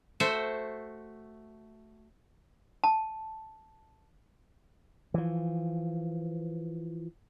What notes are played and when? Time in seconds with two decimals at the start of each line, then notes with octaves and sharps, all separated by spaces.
0.20 A3 F#4 C5 E5
2.84 A5
5.14 E3 F3